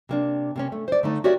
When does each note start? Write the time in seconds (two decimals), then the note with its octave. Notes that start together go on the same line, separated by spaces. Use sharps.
0.09 C3 A#3 D4
0.56 C3 A#3 C#4
0.72 A3
0.88 C5 D5
1.03 D3 A3 D#4
1.24 F#4 G4 A#4 C#5 D5 E5